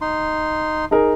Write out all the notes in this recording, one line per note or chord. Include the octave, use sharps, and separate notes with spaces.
D#4 C6
D#4 G#4 A#4